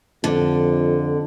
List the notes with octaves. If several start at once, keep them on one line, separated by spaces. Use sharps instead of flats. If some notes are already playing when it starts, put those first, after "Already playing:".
F2 D3